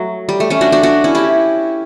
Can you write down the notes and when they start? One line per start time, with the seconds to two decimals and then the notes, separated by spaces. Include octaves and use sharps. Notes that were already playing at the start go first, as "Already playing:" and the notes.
Already playing: F#3 A3
0.29 G3
0.40 A3
0.50 A3 C#4
0.61 D4 F#4
0.72 D4 F#4
0.83 D4 F#4
1.04 C#4 E4
1.15 E4 G4